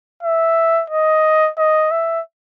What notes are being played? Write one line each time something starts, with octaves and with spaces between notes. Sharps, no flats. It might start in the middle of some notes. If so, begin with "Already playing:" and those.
E5
D#5
D#5
E5